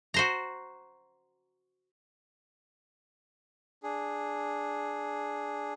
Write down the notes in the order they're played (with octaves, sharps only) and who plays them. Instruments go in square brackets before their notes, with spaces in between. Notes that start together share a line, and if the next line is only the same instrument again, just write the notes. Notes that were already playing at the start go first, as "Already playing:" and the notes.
[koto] F#4 C5 A#5
[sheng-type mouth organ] D4 G#4